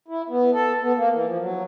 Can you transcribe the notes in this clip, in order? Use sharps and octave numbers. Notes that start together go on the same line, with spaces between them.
E4
B3
A4
B3
A#3
E3
F3
F#3